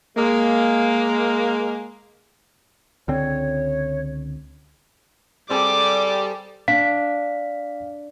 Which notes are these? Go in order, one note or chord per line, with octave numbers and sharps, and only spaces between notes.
G#3 A#3
C#2 D3 C4 C#5
G3 C4 G#4 A4 D6
D4 F5 B6